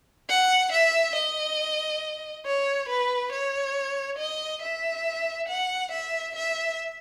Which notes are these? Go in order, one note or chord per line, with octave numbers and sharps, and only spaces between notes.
F#5
E5
D#5
C#5
B4
C#5
D#5
E5
F#5
E5
E5